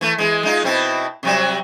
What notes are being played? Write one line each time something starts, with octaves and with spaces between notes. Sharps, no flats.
E3 A3
E3 G#3
G#3 D#4 F4
B2 C4 E4
C3 F#3 G3